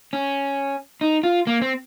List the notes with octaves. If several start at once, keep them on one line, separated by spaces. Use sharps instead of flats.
C#4
D#4
F4
A#3
C4